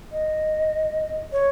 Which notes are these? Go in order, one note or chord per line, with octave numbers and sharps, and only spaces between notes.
D#5
C#5